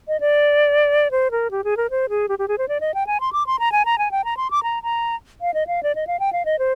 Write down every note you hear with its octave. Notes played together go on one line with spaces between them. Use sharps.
D#5
D5
C5
A#4
G4
G#4
A#4
C5
G#4
G4
G4
G#4
C5
D5
D#5
G5
G#5
C6
D6
C6
A#5
G#5
A#5
G#5
G5
A#5
C6
D6
A#5
A#5
F5
D#5
F5
D5
D#5
F5
G5
F5
D#5
C5